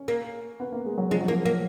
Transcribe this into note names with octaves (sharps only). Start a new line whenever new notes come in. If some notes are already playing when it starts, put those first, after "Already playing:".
Already playing: C#4
A#3
B3
A#3
G#3
F#3
F3 G#3
F#3
F3 A#3
A#3